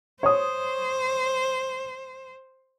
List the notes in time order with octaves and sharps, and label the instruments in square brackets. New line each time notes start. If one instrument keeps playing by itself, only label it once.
[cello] C5 [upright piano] C#5 D#6